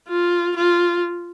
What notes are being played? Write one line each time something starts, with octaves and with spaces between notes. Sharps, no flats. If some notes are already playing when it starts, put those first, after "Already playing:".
F4
F4